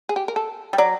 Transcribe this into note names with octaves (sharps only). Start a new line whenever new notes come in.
G#4
G4
A#4
A4
G3
F#3 D5